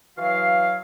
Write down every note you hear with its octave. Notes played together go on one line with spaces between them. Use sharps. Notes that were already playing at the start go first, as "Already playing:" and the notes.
E3 F#3 F#4 F5